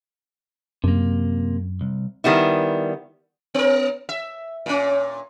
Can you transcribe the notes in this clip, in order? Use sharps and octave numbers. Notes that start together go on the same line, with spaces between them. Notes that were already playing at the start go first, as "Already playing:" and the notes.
F#2 C3 A#3
C2
D#3 G3 B3 E4
B3 A#4
E5
A#2 C#4